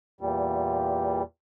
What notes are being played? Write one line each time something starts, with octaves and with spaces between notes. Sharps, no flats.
E2 A#2 G3